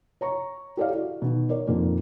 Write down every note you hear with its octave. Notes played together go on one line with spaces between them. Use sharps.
C#5 A#5 C#6
G4 A4 C#5 D5 F5
E4 F#4
B2 D#3
A#4 C#5 D5
F2 A#2 D#3 A#3